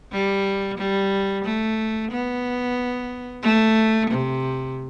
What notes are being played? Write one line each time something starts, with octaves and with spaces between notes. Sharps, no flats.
G3
G3
A3
B3
A3
C3